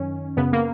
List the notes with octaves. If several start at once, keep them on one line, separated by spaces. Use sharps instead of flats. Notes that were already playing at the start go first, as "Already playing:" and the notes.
Already playing: F#2 D#3 C#4
F#2 C#3 B3
A#3